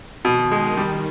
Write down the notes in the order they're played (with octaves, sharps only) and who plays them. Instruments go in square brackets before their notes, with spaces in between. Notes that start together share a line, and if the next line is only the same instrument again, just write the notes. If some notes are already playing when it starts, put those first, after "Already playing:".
[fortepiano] B2 [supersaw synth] D#3
[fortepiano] G#3
G3